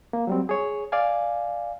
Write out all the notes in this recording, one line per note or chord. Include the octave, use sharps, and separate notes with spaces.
A#3
F#3 G3 C4
G#4 C#5
D5 F5 G#5